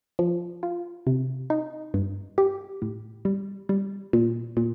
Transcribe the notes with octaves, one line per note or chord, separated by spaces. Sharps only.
F3
F4
C3
D#4
G2
G4
A2
G3
G3
A#2
A#2